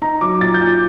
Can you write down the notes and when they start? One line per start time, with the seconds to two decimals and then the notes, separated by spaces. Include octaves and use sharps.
0.02 D#4 A#5
0.21 F#3 D6
0.41 A#2 A6
0.54 G6
0.61 A#2